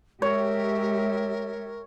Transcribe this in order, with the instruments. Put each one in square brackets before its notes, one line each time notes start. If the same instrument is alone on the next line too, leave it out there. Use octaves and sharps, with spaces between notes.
[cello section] G#3 G4 E5 [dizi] A#4 [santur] C#5